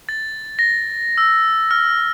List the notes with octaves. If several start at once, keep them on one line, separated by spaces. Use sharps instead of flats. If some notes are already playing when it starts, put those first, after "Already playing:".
A6
A#6
E6
F6